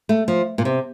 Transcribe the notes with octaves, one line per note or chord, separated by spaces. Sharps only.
A3
F3
A#2
C3